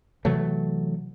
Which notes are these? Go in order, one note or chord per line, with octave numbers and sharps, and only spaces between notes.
C3 E3 F#3 A3